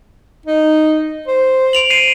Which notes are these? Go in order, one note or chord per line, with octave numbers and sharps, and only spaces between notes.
D#4
C5
D7 F7 F#7
C7 D#7